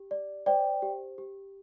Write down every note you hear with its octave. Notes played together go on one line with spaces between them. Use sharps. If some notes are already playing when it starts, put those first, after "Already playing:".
Already playing: G4
D5
C5 D5 G5
G4
G4